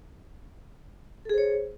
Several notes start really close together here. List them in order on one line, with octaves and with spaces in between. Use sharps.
A4 G#4 C5 C#5